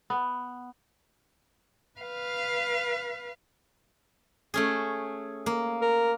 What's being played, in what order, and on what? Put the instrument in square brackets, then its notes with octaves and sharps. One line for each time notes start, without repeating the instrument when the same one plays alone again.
[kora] B3
[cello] B4 F5
[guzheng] A3 C#4 G#4
A#3
[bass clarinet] A#4